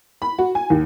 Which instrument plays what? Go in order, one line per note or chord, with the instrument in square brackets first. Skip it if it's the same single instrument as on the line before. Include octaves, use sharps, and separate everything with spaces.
[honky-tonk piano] B5
F#4
G#5
D#2